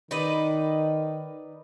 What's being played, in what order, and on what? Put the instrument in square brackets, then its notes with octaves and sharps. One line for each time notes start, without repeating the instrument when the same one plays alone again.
[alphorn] D#3 [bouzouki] D#4 B4 D5